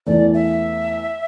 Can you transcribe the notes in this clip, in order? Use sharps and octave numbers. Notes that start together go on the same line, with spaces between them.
E2 E3 A3 D5
E5